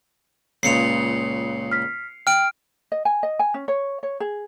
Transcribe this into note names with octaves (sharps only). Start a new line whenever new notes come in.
C#2 A#2 C#3 C7 C#7 F7
F6 B6
G5 F6 D7
D#5
G#5
D#5
G#5
C#4
C#5
C#5
G#4